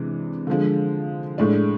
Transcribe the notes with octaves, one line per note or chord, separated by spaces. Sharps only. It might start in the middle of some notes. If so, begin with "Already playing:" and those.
Already playing: C3 E3 G#3 D4
D3 F3 G#3
A2 G#3 D4